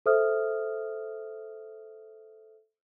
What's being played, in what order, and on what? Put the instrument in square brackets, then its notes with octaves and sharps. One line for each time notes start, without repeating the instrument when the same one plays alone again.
[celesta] A4 C5 E5 D#6 F6